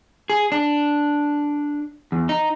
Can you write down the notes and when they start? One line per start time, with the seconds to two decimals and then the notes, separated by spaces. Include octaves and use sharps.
0.30 G#4
0.52 D4
2.12 E2
2.29 D#4